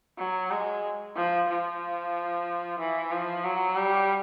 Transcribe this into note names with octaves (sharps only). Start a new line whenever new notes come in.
F#3
G#3
F3
F3
E3
F3
F#3
G3